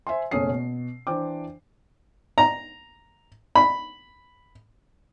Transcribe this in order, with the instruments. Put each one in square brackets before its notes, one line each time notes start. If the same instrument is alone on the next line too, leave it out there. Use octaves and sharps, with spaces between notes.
[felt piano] C5 E5 G#5 C6
F#1 B2 A3 C#4 D#6 C7
B2
E3 D4 C5 G5 D6
[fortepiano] A#5
B5